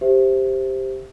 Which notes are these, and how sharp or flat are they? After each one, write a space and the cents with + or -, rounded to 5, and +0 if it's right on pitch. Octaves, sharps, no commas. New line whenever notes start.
G4 +0 C5 +0 E5 +0